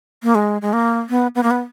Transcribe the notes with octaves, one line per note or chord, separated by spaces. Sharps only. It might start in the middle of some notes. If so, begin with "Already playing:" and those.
A#3
G#3
G#3
A#3
B3
B3
A#3
B3